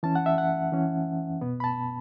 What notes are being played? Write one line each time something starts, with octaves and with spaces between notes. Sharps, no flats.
E3 C#4 A5
F#5
E5
F#5
E3 C#4
B2 B3
B5
A5